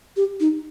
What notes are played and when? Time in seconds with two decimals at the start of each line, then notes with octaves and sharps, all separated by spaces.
0.17 G4
0.40 D#4